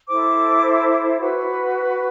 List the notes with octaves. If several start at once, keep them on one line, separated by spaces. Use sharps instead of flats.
E4 A4 C5 D6
F#4 B4